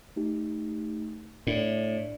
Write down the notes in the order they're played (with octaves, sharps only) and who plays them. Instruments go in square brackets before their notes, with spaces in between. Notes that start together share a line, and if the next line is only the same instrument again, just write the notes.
[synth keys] A3 D#4 G4
[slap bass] A2 [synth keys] D4 D5